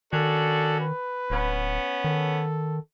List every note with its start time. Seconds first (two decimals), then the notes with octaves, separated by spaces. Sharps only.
0.13 D#3 C#4 D4 F#4 A4
0.81 B4
1.30 D1 B3 C#4
2.04 D#3 A4